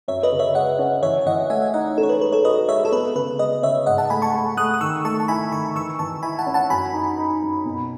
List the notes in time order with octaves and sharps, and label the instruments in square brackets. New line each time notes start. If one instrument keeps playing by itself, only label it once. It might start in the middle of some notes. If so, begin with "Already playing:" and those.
[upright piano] F#2 [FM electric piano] C#5 E5
[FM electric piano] B4 D#5
[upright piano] C#3
[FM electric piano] C#5 E5
[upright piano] G#3 [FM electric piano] D#5 F#5
[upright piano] C#4
[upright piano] E3 [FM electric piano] C#5 E5
[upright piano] E3 [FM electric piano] D#5 F#5
[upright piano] A3 [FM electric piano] E5 G#5
[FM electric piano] E5
[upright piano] D#4 [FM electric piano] D#5 F#5
[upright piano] C#4 [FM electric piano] A4
[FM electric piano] C#5
B4
[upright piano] G#3 [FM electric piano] B4
[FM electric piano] A4 C#5
[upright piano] F#4 [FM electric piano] B4 D#5
[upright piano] G#3 [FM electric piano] C#5 E5
[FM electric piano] A4
[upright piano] B3 [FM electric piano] B4
[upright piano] C#3 [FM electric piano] B4
[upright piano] G#3 [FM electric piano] B4 D#5
[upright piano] C#3 [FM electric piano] C#5 E5
[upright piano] G#2 [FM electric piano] D#5 F#5
[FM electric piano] F#5 A5
[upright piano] A3 [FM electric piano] G#5 B5
[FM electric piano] A5 C#6
[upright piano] A3
[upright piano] A3 [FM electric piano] D#6 F#6
[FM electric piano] D#6
[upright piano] D#3 [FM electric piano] C#6 E6
[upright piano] A3 [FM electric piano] A5 C#6
[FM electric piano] A5
[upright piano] E4 [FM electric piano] G#5 B5
[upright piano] D#3 [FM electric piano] A5 C#6
[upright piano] E3 [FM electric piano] C#6 E6
[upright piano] E3 [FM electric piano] A5 C#6
[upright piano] E4 [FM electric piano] G#5 B5
[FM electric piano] F#5 A5
[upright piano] C#4
[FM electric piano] F#5 A5
[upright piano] F#2 [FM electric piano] G#5 B5
[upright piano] D#4
D#4
F#2
B2